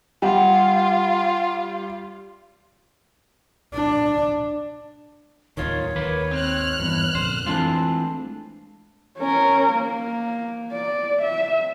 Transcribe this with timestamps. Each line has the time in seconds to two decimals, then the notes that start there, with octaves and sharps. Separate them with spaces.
0.22 G3 F4 F#5 G5
3.74 D4
5.57 D1 D#2 D#3 F4 C#5
5.96 D#2 A#3 B4
6.31 G#1 C4 F6 F#6
6.80 E2 G2
7.15 F2 A#2 D3 C5
7.46 E3 G#3 A3 C4 D4 F4
9.19 C#4 A#4
9.73 A#3
10.72 D5
11.21 E5